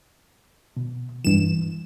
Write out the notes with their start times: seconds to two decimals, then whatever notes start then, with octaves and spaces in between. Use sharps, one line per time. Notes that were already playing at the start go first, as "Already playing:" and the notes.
0.77 B2
1.25 G2 E3 E7